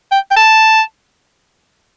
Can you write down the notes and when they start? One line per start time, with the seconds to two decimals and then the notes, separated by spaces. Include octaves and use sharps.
0.11 G5
0.31 G5
0.36 A5